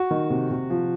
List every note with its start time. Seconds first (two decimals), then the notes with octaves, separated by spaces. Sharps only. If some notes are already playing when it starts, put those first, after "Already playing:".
Already playing: F#4
0.11 D#3
0.30 C3
0.51 C3
0.70 F3